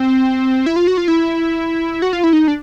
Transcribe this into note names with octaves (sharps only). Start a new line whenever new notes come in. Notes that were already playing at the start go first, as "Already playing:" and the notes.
Already playing: C4
E4
F4
F#4
F4
E4
F#4
F4
E4
D#4
D4